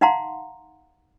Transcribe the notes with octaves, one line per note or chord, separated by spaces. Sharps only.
D#4 F5 F#5 A#5 C6